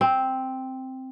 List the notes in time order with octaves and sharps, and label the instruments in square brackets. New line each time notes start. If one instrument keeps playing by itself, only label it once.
[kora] C4